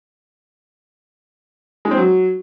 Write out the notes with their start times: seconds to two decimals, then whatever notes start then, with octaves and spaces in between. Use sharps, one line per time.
1.85 G#3
1.91 C4
1.97 F#3